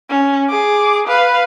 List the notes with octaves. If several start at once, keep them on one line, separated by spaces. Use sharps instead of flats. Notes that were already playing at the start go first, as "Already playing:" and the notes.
C#4
G#4 D6
B4 F5